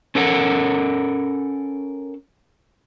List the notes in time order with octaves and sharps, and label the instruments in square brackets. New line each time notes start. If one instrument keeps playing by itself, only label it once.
[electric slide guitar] C#4 A4 A#4 F#5